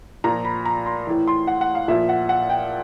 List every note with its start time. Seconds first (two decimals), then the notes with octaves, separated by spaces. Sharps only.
0.24 A#2 F3 A#5
0.45 B5
0.65 A#5
0.86 C6
1.07 A2 E3
1.28 C6
1.47 F#5
1.61 F#5
1.75 F5
1.88 A#2 F3 E5
2.09 F#5
2.29 F#5
2.50 G5